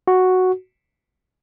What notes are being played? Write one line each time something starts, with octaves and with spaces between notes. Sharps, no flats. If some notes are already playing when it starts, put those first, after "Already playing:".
F#4